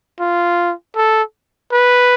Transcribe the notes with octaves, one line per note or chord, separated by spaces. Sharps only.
F4
A4
B4